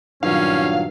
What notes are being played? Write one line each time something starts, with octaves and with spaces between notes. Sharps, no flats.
G2 A#2 D#3 F#3 C#4 F5